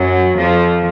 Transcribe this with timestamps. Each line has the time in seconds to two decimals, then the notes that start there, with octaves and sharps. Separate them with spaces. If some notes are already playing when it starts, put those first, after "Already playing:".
Already playing: F#2 F#3
0.37 F2 F3